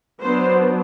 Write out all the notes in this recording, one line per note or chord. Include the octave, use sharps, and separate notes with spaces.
F#3 B3 D4 C5